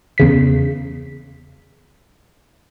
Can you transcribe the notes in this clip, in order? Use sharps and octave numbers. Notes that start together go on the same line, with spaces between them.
E2 C#3 B6